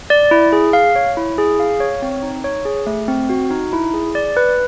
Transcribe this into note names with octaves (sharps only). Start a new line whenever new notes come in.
D5
E4
G#4
F5
C#5
E4
G#4
F5
C#5
C4
D#4
C#5
G#4
A3
C4
F#4
D#4
E4
G#4
D5
B4